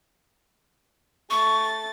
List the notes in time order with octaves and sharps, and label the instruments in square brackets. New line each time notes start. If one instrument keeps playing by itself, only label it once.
[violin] A3 A6 [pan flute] C#6